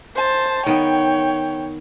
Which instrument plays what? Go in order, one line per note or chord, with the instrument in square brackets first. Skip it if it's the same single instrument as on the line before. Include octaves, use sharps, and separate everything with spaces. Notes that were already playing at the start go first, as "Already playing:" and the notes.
[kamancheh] C5 A5
[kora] D#3 B3 [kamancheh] C#5 G5